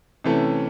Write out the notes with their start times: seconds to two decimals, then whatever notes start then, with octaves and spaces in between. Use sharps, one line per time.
0.24 C3 E3 A3 C#4